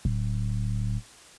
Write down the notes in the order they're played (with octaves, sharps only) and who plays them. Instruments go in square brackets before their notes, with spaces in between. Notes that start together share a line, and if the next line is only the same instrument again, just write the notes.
[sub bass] D1